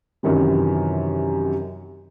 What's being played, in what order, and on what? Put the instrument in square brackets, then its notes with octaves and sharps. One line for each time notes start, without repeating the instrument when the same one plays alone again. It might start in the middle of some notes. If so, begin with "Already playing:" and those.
[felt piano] F#2 C3 D#3 E3 G3